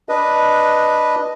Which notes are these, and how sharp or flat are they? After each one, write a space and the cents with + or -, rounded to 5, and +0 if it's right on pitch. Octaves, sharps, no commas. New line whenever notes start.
D4 +0 B4 -5 D#5 +0